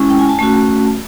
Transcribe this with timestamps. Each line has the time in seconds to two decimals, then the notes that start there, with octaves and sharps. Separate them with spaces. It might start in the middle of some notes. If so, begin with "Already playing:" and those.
Already playing: G#3 C#4 E4
0.10 G5
0.19 G#5
0.29 A5
0.39 A3 C#4 F#4